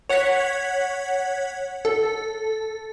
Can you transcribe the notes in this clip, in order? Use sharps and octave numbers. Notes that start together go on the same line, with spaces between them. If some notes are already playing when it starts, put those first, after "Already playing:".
C#5 F#5 F#6 G#6 B6
A4